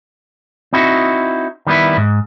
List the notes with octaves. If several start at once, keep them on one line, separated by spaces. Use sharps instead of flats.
C4 D#4 E4 F#4
D#3 G3 B3 E4
G#2